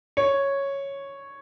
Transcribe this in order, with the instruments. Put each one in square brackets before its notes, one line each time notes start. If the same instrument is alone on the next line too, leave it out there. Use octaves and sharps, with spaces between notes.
[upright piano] C#5